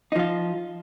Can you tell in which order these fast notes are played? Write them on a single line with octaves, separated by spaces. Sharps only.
D#4 F3 F4